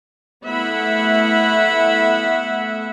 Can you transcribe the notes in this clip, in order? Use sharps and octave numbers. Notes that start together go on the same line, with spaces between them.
A3 B3 E4 E5 F#5 B5